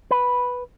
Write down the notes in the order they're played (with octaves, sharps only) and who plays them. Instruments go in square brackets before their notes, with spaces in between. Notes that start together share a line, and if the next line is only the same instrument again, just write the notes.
[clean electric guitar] B4